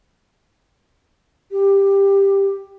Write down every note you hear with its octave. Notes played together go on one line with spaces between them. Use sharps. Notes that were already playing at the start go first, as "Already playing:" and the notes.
G4